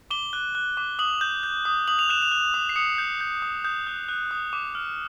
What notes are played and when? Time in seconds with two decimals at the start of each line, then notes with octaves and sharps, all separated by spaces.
0.11 D6 G7
0.33 F#6
0.55 F#6
0.77 D6
0.99 D#6 F#7
1.21 G6
1.43 G6
1.65 D#6
1.88 D#6 F#7
1.99 F7
2.09 F#6 E7
2.22 F7
2.32 F#6
2.54 D#6
2.69 C7
2.76 D#6 C#7
2.98 G6
3.21 G6
3.42 D#6
3.64 D#6 G6
3.87 F#6
4.08 F#6
4.31 D#6
4.53 D6
4.75 F6